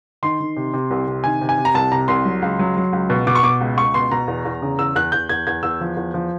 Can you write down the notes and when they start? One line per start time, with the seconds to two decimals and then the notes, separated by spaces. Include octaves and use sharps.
0.23 D#3 C6
0.40 D#3
0.57 C3
0.74 C3
0.91 C2
1.07 C3
1.24 D#3 G#5
1.41 C3
1.49 G#5
1.58 C3
1.65 A#5
1.74 C2 A5
1.92 C3 A#5
2.08 C2 C6
2.25 F#3
2.42 C#2
2.59 F#3
2.77 F#3
2.93 C#2
3.10 B2
3.27 B2 D6
3.35 C#6
3.43 B2 D6
3.61 C#2
3.77 C#2 C#6
3.94 B2 C6
4.11 B2 A#5
4.28 E2
4.45 E2
4.62 C#3
4.79 E2 E6
4.96 E2 F#6
5.12 E2 G6
5.29 E2 G#6
5.47 E2 G#6
5.63 E2 E6
5.81 F3
5.96 E2
6.14 F3